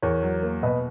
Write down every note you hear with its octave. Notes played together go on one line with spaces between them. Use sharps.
E2 A#4 C#5
F#3
A#3
B2 B4 D#5